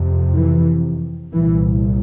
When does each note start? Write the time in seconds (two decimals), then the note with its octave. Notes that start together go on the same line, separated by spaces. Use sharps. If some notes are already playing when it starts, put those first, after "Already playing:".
Already playing: F2 C3
0.34 E3
1.32 C2 A#2 E3